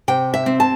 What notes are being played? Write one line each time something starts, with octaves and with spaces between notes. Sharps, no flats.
C3 G5
E5
C4
A5